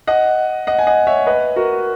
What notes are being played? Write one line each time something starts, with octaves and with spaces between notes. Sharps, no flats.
D#5 F#5
D#5 F#5
G#5
D#5 F#5
C#5 E5
B4 D#5
F#4 A#4